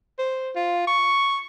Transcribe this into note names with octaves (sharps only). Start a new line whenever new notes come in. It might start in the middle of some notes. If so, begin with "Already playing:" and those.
C5
F4
C#6